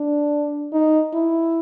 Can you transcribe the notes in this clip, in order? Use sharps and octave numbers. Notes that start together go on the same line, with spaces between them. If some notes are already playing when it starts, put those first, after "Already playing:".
Already playing: D4
D#4
E4